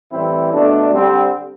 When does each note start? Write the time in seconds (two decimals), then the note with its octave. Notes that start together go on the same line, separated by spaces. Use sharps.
0.12 A2 E3 G3 C4 E4
0.52 B2 A3 D4
0.91 D3 G3 C4